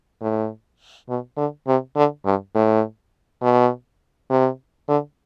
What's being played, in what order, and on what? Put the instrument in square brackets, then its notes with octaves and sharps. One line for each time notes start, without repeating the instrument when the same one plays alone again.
[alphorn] A2
B2
D3
C3
D3
G2
A2
B2
C3
D3